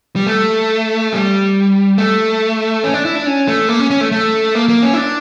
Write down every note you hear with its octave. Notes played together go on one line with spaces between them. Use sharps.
G3
A3
G3
A3
C#4
D4
E4
D4
C#4
A3
A#3
C#4
C#4
A3
A3
A#3
A#3
C#4
E4
D4